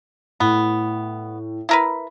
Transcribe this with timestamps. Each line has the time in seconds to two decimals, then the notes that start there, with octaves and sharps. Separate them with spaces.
0.40 A2 B3
1.69 E4 A#4 B4